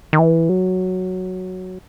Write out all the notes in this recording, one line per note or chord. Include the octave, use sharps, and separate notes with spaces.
D#3
E3
F#3